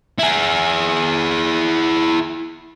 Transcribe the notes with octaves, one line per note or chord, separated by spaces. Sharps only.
E4 G#4